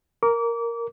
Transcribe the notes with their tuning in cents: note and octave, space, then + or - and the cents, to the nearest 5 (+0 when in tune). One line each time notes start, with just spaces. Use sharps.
A#4 +0 D6 -30